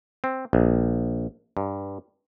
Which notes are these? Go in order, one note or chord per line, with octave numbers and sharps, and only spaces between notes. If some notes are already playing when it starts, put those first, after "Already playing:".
C4
A#1
G2